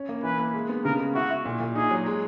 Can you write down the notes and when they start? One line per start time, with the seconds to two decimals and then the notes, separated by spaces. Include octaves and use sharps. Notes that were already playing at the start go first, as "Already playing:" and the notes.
Already playing: C#4
0.09 A#3
0.23 E3 B4
0.39 A#3
0.54 G#3
0.69 B3
0.84 C#3 A#4
0.99 G#3
1.15 E4 F#4
1.30 E4
1.45 A#2
1.60 A#2
1.75 D#4 G#4
1.91 F#3
2.06 G#3